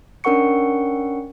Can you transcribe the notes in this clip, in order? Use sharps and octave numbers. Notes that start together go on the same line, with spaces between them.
C#4 D4 A#4 F#5 C#6 C#7